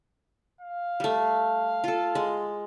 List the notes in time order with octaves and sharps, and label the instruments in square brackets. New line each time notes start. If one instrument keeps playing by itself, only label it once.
[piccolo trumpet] F5
[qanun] G3 A3
F4 A4
G#3